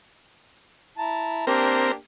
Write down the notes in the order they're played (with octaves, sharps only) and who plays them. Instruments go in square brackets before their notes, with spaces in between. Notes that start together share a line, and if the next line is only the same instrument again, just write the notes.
[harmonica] E4 A5 A#5
[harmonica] A#3 D4 G4 [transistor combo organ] C4 A#4